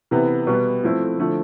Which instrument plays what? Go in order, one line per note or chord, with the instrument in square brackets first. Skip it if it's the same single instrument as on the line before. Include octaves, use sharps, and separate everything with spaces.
[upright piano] C3 E3 B3
B2 G3 B3
F3 A3 C4 E4
D3 F3 A3 E4